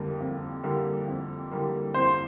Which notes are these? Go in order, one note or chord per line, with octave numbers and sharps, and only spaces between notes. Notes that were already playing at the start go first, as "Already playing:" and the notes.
Already playing: F2 D3 G3 A#3
F2
D3 G3 A#3
F2
D3 G3 A#3
F2 C5 C6